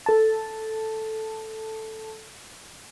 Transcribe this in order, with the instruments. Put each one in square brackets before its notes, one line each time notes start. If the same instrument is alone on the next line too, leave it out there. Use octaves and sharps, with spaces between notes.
[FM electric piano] A4 A5